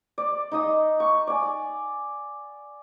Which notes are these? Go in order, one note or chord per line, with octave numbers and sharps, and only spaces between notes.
D5
D#4 D#5 D#6
C#6
D5 G#5